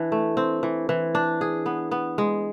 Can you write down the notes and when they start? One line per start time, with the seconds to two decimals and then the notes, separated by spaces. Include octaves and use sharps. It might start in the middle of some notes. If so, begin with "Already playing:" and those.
Already playing: E3 D4
0.12 A3
0.37 C4
0.63 E3
0.89 E3
1.15 D4
1.41 G#4
1.66 B3
1.91 B3
2.18 G#3